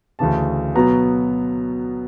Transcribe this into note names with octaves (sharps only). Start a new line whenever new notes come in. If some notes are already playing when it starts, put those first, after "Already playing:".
D2 C#3 E3 A5
B2 F#3 B3 A#5